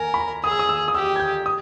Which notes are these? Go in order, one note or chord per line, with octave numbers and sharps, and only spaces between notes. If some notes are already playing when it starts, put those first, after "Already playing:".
Already playing: A#4 G#5 A#5
B5
A#5
G#4 D#6
E6
D#6
E6
D#6
G4 E6
G#6
G6
D#6